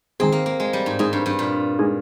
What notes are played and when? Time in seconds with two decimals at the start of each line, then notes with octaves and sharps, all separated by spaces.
0.20 D#3 G#3 C4 D#4 G#4
0.32 A#3
0.46 A#3
0.60 G#3
0.73 G3
0.86 G#2
0.99 G#2 G#3 D#4 G#4
1.13 G2
1.26 G2
1.39 A#2
1.79 G#3 D#4 G#4